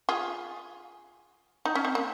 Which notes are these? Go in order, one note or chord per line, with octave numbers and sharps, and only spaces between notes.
F4 G#4
D#4
C#4
C4
A#3